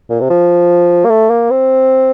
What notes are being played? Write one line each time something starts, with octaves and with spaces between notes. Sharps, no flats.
A#2
C3
F3
A#3
A3
A#3
C4